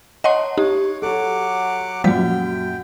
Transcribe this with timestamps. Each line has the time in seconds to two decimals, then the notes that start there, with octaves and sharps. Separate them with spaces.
0.24 D#4 C#5 D#5 F#5 A5 C6
0.58 D#4 G4 C#5
1.02 F#3 A4 C#5 F#5 D6
2.04 F#2 A#2 F3 G3 F#4 F#5 G5 B6